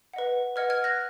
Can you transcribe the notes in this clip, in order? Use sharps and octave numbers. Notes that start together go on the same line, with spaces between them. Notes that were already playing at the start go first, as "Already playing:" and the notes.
B4 D#5 F#5
B4 D#5 F#5 F6 G#6
F6 G#6
F#6 A#6